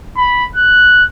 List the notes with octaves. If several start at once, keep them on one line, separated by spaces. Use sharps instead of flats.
B5
F#6